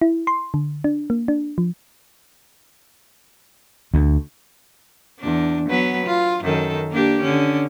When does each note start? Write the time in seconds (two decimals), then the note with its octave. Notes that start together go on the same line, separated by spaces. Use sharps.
0.02 E4
0.27 C6
0.54 D3
0.84 D4
1.10 A#3
1.28 D4
1.58 F3
3.94 D2
5.20 E2 D4
5.70 F#3 B3 B4
6.06 F4
6.44 F#2 D#3 A4
6.91 A#3 D4 G4
7.22 D3 C#4